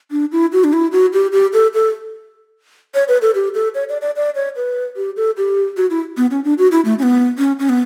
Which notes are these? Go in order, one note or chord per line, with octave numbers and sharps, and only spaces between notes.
D4
E4
F#4
D4
E4
F#4
G4
G4
A4
A4
C#5
B4
A4
G4
A4
C#5
D5
D5
D5
C#5
B4
G4
A4
G4
F#4
E4
B3
C#4
D4
F#4
E4
A3
C#4
B3
C#4
C#4
B3